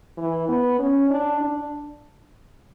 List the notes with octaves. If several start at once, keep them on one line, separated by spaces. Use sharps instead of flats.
E3
B3
C#4
D4
D4